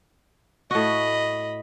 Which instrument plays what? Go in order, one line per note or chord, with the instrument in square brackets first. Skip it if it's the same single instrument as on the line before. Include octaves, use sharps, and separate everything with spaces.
[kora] A2 F#4 [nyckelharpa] D#5 B5